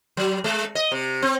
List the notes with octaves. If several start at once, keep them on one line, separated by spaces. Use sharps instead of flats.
F#3
G#3
D#5
C3
C4